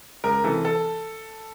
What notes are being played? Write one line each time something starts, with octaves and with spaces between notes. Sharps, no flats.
C#2 A#4
C3 E3 A4
A4